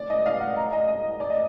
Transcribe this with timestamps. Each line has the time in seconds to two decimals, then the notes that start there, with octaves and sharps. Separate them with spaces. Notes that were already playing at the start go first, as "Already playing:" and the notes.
Already playing: D5
0.10 D#5
0.26 F5
0.40 F#5
0.56 A#5
0.73 D#5
0.88 D#5
1.20 D5
1.30 D#5